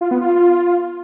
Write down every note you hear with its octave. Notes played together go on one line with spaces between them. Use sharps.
F4
B3
F4